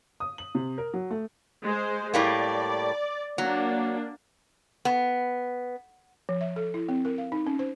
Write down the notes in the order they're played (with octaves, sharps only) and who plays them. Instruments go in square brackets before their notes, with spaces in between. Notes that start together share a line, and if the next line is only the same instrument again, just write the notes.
[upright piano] D#6
F#7
C3
A#4
F#3
A3
[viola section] G#3 C5
[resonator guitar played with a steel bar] A2 G3 A#3 [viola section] D5
[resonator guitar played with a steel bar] F#3 [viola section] A#3 D4
[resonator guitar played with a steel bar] B3
[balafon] F3
E5
A4
E4
C4
A#4
F5
D#4
C#4
C5